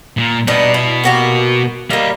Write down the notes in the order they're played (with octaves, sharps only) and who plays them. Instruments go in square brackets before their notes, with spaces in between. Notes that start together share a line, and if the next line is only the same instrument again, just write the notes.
[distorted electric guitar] A#2
[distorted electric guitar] B2 B3 [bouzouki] G3 D4 D#4
[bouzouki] E4
A#3 F#4 G4
[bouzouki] G3 A#3 [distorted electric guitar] D#5 F5